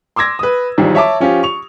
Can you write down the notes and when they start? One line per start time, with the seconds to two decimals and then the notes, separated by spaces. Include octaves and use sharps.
0.16 C6 D6 E6 G#6 A#6
0.39 B4 D#6
0.78 B1 E2 D#3 F3 G3
0.95 C#5 E5 A5 D6
1.20 F3 C#4 F4 G4
1.43 C#6 F7